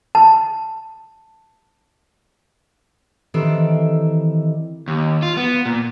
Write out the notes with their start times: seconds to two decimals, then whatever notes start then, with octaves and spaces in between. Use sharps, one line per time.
0.15 A5
3.34 D#3 E3 C4 D4 G4 A4
4.88 D#2
5.22 F4
5.37 B3
5.66 A#2